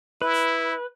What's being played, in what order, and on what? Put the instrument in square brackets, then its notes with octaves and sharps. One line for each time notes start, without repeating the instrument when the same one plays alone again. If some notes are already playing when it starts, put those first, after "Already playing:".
[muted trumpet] E4 [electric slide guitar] B4